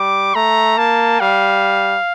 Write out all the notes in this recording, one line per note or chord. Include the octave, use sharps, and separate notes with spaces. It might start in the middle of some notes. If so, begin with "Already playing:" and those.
Already playing: G3 D6
A3 A#5
A#3 A5
G3 F5